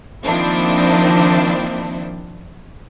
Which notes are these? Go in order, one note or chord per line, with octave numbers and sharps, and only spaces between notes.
D#3 F3 A#3 C4 D4 E4